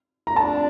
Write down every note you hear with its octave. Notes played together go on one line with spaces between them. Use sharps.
A#5
D4 A5